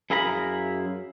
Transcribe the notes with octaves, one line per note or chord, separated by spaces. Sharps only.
F#2 E4 G#4 F5 A#5 B5